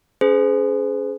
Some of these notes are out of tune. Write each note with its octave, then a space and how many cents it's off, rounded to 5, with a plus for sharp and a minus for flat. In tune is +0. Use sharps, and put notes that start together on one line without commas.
C#4 +15 G#4 +25 C5 -40